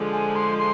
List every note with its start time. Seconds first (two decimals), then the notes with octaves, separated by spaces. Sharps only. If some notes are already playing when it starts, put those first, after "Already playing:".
Already playing: D3 F3 G#3
0.13 G#5
0.35 C6
0.58 C6